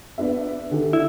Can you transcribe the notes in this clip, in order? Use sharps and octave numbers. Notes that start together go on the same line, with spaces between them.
B3 D4 E5
D3 D#3 G4
D4 E4